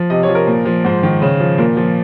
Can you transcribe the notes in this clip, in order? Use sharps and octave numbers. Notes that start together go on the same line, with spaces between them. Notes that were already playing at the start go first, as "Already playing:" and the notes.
Already playing: F3
C3 D#5
C#5
F3
A#4
A#2
F3
G#2 C5
D#3
C#3
F3
A#2 A#4
F3